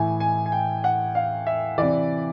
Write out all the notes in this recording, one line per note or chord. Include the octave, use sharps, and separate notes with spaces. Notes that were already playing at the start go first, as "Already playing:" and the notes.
Already playing: A2 E3 G#5
G#5
G#5
G5
F#5
F5
E5
C3 E3 D5